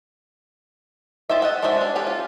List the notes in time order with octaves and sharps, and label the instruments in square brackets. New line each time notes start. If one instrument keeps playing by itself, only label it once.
[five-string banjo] F4 G4 C5 D#5 E5
D#5 F#5 G5
G#3 D4 F#4 C5 E5
C#4 D4
C#4 G4 A4
F4